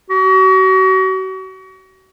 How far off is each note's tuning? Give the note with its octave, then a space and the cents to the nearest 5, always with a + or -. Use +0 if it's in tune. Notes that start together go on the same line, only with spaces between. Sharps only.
F#4 +35